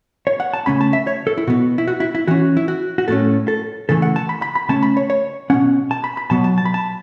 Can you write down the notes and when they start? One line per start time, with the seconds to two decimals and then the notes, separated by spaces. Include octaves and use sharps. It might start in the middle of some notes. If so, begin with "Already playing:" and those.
0.27 C#5
0.40 F#5
0.54 A5
0.66 C#3 A3 C#4 B5
0.81 A5
0.93 E5
1.07 C#5
1.27 A4
1.38 E4
1.47 B2 B3 F#4
1.78 E4
1.88 F#4
2.00 E4
2.15 E4
2.28 E3 C#4 F#4
2.57 E4
2.68 F#4
2.98 F#4
3.08 A2 A3 C#4 A4
3.48 A4
3.89 C#3 E3 A3 A4
4.02 F#5
4.16 A5
4.29 B5
4.42 B5
4.55 B5
4.69 C#3 A3 C#4 A5
4.83 B5
4.97 C#5
5.10 C#5
5.50 B2 A3 C#4 F#5
5.91 A5
6.04 B5
6.17 B5
6.30 B2 F#3 B3 A5
6.44 A5
6.58 A5
6.65 B5
6.74 A5